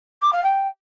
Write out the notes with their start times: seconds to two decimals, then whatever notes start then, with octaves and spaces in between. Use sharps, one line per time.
0.22 D6
0.32 F5
0.43 G5